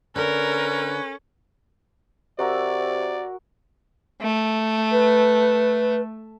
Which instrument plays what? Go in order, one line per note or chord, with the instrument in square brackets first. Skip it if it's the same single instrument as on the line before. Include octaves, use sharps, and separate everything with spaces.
[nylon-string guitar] D3 [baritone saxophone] C#4 [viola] A#4 [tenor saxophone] B4
[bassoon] C3 [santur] F#4 A#4 E6 [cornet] D5
[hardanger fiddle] A3
[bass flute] B4